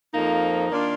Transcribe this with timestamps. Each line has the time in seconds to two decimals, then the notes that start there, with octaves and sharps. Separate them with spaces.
0.13 F2 F3 A#3 D#4
0.70 D#3 A#3 D4 F4